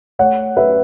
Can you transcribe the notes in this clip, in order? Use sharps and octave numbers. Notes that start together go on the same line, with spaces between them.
A3 C#5 F#5
C#4 B4 E5